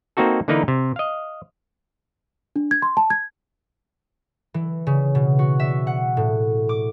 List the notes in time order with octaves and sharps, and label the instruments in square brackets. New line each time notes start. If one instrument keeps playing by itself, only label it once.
[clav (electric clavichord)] A#3 C4 D#4 F#4 A4
D3 E3 A#3 D#4 A#4 B4
C3
D#5 F5
[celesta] D4
G#6
C6
A5
G#6
[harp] E3
C#3
B2
F#4
E5
F#5
A2
D6